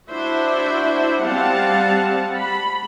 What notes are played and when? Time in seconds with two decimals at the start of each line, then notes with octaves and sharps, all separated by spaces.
0.10 D4 E4 F#4 C5 E5
1.24 G3 C4 F5 F#5 A5
2.37 B5